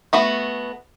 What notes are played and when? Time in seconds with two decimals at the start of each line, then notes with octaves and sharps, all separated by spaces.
0.13 A3 B3 F#4